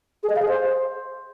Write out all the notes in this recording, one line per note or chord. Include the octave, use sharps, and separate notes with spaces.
G#4
D#5
F5
G#4
C5